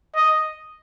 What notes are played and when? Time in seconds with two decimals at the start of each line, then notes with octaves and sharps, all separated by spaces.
0.16 D#5